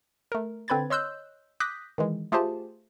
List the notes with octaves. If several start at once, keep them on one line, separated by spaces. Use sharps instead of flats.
A3 A#4
D3 C4 B4 B5 G#6 A6
C#5 D#5 C6 E6 F#6 G6
D6 D#6 F#6 G6 A#6 B6
D#3 E3 G#3
A3 F4 G4 G#4 C5 A5